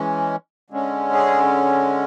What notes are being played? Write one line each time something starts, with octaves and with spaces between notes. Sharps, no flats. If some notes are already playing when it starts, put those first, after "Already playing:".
Already playing: E3 G#3 C#4
D3 G#3 C#4
G#4